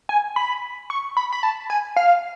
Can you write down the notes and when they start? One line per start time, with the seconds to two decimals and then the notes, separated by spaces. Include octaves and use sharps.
0.09 G#5
0.36 B5
0.90 C#6
1.17 B5
1.32 B5
1.43 A5
1.70 G#5
1.96 F5